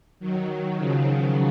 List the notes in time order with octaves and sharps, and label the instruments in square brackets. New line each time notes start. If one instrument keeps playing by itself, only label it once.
[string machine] D#3 F#3
C#3 F3